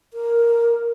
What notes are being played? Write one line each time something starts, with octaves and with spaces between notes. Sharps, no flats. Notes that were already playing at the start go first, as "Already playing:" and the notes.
A#4